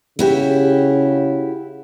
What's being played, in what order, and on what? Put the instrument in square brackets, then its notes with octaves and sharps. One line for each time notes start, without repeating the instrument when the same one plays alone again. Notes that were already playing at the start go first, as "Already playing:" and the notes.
[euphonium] C#3 [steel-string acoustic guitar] E4 F#4 G4